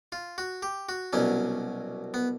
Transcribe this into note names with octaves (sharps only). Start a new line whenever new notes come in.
F4
F#4
G4
F#4
C2 B2 F#3 C#4
B3